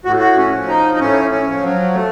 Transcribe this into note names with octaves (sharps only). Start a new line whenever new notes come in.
A2 F#4
F#4
C#4
F3
D#4
D#4
A2 C#4
C#4
F3
F#3
A3